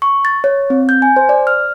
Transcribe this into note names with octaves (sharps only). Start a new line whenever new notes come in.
C#6
A6
C#5
C4
G6
G#5
C5
D5
F6